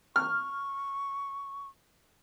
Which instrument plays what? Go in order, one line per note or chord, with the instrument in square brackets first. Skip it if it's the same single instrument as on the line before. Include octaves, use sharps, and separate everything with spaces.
[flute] C#6 [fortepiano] F6